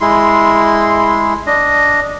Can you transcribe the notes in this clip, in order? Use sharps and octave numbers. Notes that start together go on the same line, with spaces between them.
G#3 E4 C6
D4 D#5